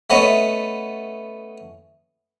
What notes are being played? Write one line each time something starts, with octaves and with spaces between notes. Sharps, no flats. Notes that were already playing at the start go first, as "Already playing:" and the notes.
A3 B3 C#4 D#5